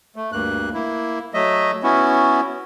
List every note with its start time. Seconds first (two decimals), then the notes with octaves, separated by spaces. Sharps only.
0.16 A3
0.32 D2 G2 A#3 F#6
0.74 A#3 E4
1.34 F#3 A3 D#5 E5
1.83 B3 C#4 E4 F#4